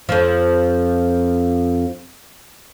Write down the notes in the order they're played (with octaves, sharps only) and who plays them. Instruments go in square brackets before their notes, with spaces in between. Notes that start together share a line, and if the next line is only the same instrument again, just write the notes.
[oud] F2 F3